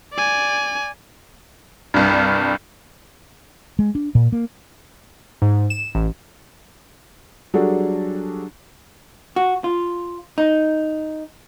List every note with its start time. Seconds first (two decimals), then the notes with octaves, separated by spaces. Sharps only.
0.13 D5 G#5
1.94 C2 G2
3.79 G#3
3.95 D4
4.15 A#2
4.32 A#3
5.42 G#2
5.70 E7
5.95 A1
7.54 F#3 G3 D4 F#4 G#4 A4
9.36 F#4
9.64 F4
10.38 D#4